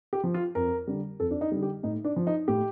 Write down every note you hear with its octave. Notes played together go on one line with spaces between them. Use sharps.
G4
F3
F4
F2 A#4
D3 G3
F2 A4
D4
D#4
D3 G3
G4
A2 D#4
D4
F3
D#4
A2 G4